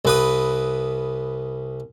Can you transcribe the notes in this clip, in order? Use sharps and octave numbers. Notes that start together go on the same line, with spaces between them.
C2 B4 D#6